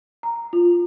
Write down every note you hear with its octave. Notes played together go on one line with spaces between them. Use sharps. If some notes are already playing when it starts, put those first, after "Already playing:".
A#5
F4